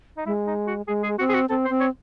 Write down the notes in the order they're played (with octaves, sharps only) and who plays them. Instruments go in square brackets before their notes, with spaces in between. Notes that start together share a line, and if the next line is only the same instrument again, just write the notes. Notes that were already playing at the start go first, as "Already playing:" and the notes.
[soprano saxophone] D#4
[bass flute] G#3 [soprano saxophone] E4
[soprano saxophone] D#4
F#4
[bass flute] G#3 [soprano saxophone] G#4
[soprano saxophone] G#4
[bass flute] C4 [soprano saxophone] F#4
[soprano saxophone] G#4
F#4
[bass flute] C4 [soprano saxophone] A4
[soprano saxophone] C5
[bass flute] C4
[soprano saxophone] C#5